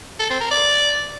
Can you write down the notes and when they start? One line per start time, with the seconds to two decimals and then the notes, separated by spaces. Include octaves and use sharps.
0.19 A4
0.30 C4
0.40 A#4
0.51 D5